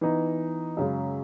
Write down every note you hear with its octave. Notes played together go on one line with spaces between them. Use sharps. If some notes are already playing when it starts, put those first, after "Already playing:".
E3 B3 D#4
F#2 C#3 G#3